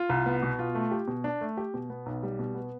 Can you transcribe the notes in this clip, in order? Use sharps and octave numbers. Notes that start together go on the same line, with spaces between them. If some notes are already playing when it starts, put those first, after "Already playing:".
Already playing: F4
C2
B3
B2
F4
A3
G4
B2
D4
A3
G4
B2
B3
B1
G3
B2
B3